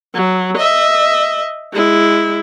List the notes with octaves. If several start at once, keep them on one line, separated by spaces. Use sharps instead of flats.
F#3
D#5 E5
G#3 E4